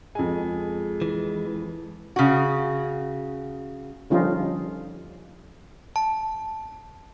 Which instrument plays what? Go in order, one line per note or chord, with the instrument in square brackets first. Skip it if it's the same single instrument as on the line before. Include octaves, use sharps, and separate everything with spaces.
[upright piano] F2 G#5 [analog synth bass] G#3
[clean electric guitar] E3
[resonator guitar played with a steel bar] C#3 F#4
[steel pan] D3 F3 G3 C#4 D#4 F4
[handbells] A5